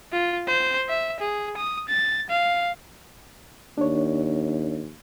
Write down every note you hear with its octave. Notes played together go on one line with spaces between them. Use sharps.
F4
C5
E5
G#4
D#6
A6
F5
D#2 D4 C#5